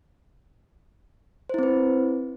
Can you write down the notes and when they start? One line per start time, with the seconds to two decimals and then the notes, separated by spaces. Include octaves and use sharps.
1.49 C5
1.54 E4
1.59 C4
1.63 B4